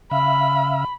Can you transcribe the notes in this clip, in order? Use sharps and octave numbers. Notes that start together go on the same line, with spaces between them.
C#3 E5 F5 B5